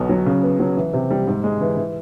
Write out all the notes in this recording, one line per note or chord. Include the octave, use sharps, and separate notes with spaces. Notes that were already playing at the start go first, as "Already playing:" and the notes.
Already playing: B1 B2
F#3
C#3
B3
F#3
E3
C3
G3
G#2
G#3
E3
E3